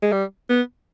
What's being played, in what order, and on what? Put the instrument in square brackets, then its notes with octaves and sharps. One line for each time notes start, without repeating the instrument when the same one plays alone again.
[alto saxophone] G#3
G3
B3